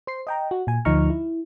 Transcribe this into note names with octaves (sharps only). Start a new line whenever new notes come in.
C5 C7
D#5 G5 A#5
F#4
A#2 G#5
D2 F3 D#4 A#5 C#6 F6
E4